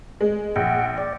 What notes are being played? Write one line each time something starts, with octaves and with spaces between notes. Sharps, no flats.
G#3
A#1 F#5 G5
D5